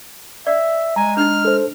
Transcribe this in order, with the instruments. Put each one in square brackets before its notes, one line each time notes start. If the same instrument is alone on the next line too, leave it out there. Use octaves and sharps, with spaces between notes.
[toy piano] D5 [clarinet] E5
[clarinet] G#3 [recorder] G#5 [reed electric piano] A#5
[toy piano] D4 D#4 [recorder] F6
[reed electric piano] A4 C5